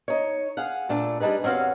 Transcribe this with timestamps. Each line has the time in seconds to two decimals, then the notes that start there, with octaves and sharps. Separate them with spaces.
0.08 D#4 C#5
0.57 G#4 F5 F#5
0.89 A#2 A3 D4
1.20 G3 D4 D#4 G#4 B4
1.43 E2 C4 C#4 F#4 F5